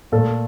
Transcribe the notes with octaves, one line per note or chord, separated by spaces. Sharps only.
A#2 A4
A3